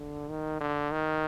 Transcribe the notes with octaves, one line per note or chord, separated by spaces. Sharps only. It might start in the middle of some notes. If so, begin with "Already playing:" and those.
Already playing: D3
D#3
D3
D#3